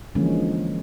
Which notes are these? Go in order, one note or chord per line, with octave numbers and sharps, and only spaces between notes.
D3 E3 F3 G#3 A#3 C#4